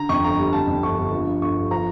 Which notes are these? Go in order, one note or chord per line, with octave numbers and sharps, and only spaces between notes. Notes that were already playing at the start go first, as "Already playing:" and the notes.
Already playing: D3 A#5
F2 C#6
G1 A#5
G3
D3 A5
F2
G1 C#6
G1
F3
G2
G1 C#6
G1
F3 A#5